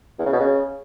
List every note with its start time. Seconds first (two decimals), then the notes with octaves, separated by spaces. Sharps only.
0.19 E2
0.26 C#3
0.33 B2
0.40 C#3